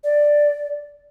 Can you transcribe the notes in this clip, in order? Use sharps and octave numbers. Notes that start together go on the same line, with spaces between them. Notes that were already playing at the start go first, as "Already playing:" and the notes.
D5